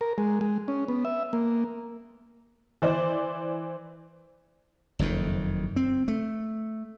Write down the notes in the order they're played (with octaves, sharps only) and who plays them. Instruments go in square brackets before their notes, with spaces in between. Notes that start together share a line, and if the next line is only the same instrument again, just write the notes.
[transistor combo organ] A#4
G#3
G#3
C#4
B3
E5
A#3
[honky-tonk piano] E3 C5 D5
[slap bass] F#1 F2 D#3
C4
A3